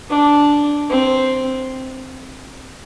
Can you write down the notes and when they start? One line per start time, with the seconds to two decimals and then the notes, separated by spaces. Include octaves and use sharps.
0.10 D4
0.91 C4